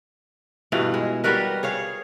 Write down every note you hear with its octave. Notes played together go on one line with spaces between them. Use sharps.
G2 B2 E3 F4
G#3
G3 F#4 A#4 B4
G#4 C#5 F5